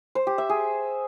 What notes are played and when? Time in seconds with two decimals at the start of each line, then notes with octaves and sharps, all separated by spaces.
0.15 C5
0.27 G4
0.38 E5
0.49 G#4